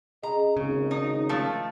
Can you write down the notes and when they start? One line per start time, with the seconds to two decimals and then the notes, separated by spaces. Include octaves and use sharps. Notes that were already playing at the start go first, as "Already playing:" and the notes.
0.23 C#4 G#4 D#5 A#5
0.57 G#1 C#3
0.91 D#4
1.29 F3 A3